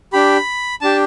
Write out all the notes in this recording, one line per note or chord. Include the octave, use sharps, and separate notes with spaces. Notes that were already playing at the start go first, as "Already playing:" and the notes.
D4 G4 B5
D4 G4 A5